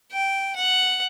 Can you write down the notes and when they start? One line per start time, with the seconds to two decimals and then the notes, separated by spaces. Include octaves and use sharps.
0.12 G5
0.56 F#5